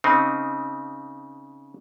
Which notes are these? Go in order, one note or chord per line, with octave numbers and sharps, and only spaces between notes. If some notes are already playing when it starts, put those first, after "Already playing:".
C#3 C4 D#4